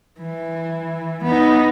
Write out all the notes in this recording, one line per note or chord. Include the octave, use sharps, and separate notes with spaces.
E3
B3 D#4